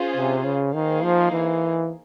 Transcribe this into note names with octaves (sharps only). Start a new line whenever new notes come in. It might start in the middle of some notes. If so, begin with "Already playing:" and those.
Already playing: C#4 F4 G#4 C5
C3
C#3
D#3 A#3 D#4 G#4 C5 F5
F3
E3